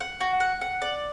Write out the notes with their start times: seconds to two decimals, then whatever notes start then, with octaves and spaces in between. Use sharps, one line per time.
0.01 F#5
0.21 F#4
0.40 F#5
0.61 F#5
0.82 D5